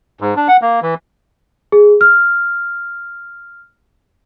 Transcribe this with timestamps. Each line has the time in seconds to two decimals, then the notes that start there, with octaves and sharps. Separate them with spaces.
0.21 G#2
0.36 D4
0.48 F#5
0.62 A#3
0.82 E3
1.72 G#4
2.01 F6